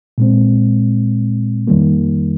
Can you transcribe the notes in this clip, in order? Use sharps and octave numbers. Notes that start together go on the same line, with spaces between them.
A#2 G#3 C4
F2 D#3 G3 A#3